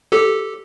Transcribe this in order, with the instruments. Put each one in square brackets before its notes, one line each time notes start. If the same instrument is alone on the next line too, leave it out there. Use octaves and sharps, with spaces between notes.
[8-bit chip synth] G4 A4